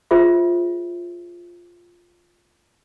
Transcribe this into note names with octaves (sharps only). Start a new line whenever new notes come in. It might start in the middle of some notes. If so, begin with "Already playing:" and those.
F4 G#4 C5 E5